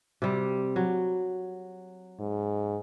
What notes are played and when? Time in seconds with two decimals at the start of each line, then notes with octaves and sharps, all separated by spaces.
0.22 C3 G3
0.76 F#3
2.20 G#2